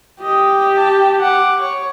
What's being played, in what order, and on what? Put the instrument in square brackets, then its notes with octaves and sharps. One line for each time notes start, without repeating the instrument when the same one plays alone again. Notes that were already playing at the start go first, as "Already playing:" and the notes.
[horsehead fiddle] G4 [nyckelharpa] D#5
[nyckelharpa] A5
F#5 D6
C#5 C#6